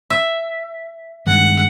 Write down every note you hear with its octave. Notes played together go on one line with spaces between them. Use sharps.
E5
G2 D#3 G#3 F#5